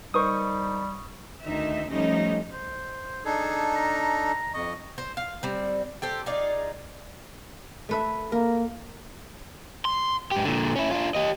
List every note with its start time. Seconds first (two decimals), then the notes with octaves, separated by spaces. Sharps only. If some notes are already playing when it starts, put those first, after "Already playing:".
0.14 G3 D#4 A#4 C5 C#6 D#6
1.42 D2 D#3 D#4 E5
1.89 F3 G3 A3 C#4 D#4
2.52 C5
3.25 D4 D#4 G#4 A4
3.76 A#5
4.54 F2 D#5 C#6
4.98 C5
5.17 F5
5.43 G3 C4
6.02 G4 A4 C5
6.26 D#4 F4 G#4 D5
7.89 A3 B4 E5
8.32 A#3 A#4
9.85 C6
10.31 G#2 G4
10.45 A#2 D3
10.76 C#4 E4
10.91 D4 F4
11.15 G4 D#5